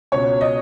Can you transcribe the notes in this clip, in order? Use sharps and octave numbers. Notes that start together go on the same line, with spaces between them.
C#2 B2 C#5
D#5